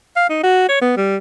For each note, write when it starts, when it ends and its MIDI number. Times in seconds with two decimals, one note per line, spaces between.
0.16 0.26 77
0.30 0.42 63
0.43 0.68 66
0.69 0.78 73
0.82 0.92 59
0.97 1.17 55